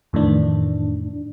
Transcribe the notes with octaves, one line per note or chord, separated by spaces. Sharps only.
F2 A2 D#3 E3 D4